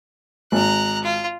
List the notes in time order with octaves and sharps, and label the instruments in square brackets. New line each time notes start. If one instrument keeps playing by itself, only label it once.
[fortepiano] G#1 [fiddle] A#5 F#6
[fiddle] F4